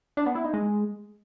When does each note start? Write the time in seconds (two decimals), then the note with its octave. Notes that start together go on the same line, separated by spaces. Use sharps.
0.17 D4
0.26 B3
0.35 E4
0.44 D#4
0.53 G#3